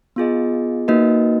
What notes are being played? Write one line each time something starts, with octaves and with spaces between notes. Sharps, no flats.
B3 F4 G#4 D#5
A#3 D#4 F#4 B4 D#5